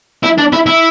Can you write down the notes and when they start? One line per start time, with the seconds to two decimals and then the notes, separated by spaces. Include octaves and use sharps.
0.23 E4
0.38 D4
0.52 E4
0.66 E4